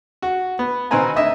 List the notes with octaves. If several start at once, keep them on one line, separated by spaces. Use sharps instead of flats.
F#4
B3
B2 D#3 C4 B4 G#5 A#5
D2 D#5 E5